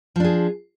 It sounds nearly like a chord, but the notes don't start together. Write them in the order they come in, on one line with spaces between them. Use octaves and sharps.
F3 D4 G#4